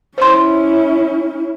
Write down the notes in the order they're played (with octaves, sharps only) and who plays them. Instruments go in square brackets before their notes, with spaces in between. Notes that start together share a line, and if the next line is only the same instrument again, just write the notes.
[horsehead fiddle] C#4 E4 [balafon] C5 C6